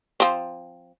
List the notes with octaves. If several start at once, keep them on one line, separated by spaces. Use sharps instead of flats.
F3 C4